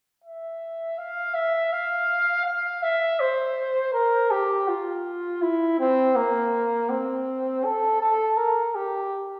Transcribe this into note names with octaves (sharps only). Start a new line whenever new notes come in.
E5
F5
E5
F5
F5
E5
C5
A#4
G4
F4
E4
C4
A#3
C4
A4
A4
A#4
G4